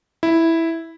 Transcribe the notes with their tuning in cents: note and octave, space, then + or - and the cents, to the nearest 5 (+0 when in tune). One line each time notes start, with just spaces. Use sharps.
E4 -5